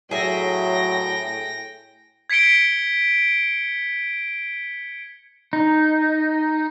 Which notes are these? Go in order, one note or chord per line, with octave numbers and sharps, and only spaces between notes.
A2 F#3 G#4 E5 G5 A#6
G#6 B6 C#7 D7 G7
D#4